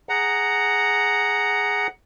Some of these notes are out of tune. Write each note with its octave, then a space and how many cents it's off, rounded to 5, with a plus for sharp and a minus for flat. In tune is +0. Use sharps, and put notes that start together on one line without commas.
G#4 -5 F#5 +5 A#5 +0